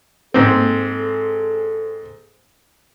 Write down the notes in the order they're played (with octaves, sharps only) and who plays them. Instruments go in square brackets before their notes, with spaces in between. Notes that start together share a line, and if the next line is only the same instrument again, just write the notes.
[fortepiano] G#2 C4 [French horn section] G#4 A4